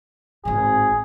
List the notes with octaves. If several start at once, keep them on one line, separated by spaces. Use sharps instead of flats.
G#1 A2 G#4